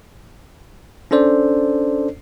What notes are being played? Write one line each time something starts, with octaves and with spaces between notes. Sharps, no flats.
C#4 D4 A4 C5 D5